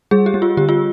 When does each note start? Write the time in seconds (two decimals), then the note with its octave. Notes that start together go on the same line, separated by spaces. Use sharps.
0.11 G3 G#4
0.26 G4
0.34 G3
0.42 F4
0.57 D3 G4
0.69 F4